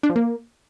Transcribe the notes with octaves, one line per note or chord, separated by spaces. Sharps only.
D4
F3
A#3